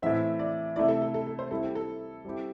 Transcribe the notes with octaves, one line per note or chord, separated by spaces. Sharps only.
A2 E3 C4 E5
D5
C3 A3 E4 D5
A4
A4
A4
A4
C5
G3 C4 E4 A4
G4
A4
G3 C4 E4 G4